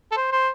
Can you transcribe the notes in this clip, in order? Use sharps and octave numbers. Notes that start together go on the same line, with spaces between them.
A4
C5
C5